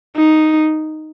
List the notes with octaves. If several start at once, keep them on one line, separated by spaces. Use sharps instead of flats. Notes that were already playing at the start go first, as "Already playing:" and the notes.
D#4